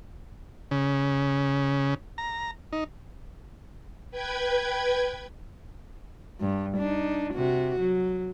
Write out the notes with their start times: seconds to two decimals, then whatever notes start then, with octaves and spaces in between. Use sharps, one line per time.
0.71 C#3
2.18 A#5
2.73 D#4
4.11 B4 G5 G#6
6.41 G2
6.77 D4 D#4
7.34 C3 F#4
7.79 F#3